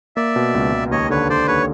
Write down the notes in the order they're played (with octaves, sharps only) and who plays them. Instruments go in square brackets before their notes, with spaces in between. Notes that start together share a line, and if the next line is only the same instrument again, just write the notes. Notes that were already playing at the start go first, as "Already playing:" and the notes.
[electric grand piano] A#3 [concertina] D5 E5
[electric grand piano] B2
C#2
C#2
[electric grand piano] D#2 [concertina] C#5 D#5
[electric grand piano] D3 [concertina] B4 C#5
[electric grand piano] D3 [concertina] C5 D5
[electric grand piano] D#2 [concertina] B4 C#5